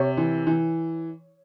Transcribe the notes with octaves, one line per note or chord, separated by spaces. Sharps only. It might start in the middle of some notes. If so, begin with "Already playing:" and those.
Already playing: C3 C#5
E3
E3